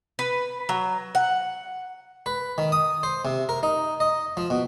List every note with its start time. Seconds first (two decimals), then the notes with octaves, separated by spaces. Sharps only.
0.19 B4
0.69 F#3
1.15 F#5
2.26 B4
2.58 D#3
2.72 D#6
3.03 C5
3.25 C3
3.49 A#4
3.63 D#4
4.00 D#5
4.37 F3
4.50 B2